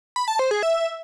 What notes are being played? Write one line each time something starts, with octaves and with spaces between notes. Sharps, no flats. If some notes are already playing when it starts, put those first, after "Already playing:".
B5
A5
C5
G#4
E5